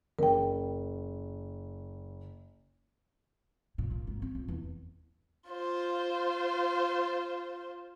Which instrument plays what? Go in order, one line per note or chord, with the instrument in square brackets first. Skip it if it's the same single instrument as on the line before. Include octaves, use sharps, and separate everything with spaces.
[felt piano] F#1 [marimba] A#4 G5
[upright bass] A#2
A#2
G#1
C4
F2
E2
[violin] F4 C5